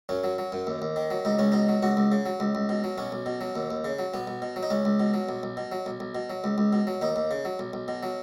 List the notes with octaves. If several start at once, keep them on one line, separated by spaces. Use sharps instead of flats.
F#2 C#4
F#3
F#3
F#2
D#2
D#2
D#3
F#3
C#2 D#4
C#2 C#4
B2 D#4
F#3
C#2 F#4
C#2
C#3
F#3
C#2
C#2
B2
F#3
B1 C#4
B1
B2
F#3
D#2
D#2
C#3
F#3
B1 B3
B1
B2
F#3
D#4
C#2 C#4
C#2
B2
F#3
B1
B1
B2
F#3
B1
B1
B2
F#3
C#2
C#2
B2
F#3
D#2 D#4
D#2
C#3
F#3
B1
B1
B2
F#3